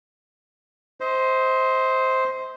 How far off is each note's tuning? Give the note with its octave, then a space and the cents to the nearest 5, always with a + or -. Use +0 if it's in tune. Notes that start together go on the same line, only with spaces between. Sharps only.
C5 +0 D#5 +40